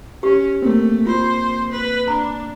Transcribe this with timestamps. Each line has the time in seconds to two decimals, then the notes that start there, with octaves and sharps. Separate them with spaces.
0.23 C#4 G4 C#6
0.62 A3 A#3 C4
1.07 F4 C5
1.71 B4
2.08 D4 A#5 B5